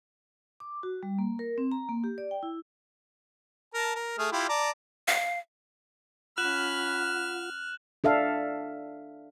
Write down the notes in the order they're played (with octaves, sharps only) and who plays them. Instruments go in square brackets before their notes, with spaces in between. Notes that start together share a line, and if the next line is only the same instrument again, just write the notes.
[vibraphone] D6
F#4
G3
A#3
A#4
C4
A#5
A#3
G4
D5
G5
E4
[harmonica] A#4 A5
A#4
A3 G#4 F6
E4 F4 G4
D5 A5 A#5
[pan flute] F5
[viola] C#4 B5 [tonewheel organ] F4 F#5 [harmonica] F6 [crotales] F#6 E7 F#7
[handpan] D4 A4 E5 F5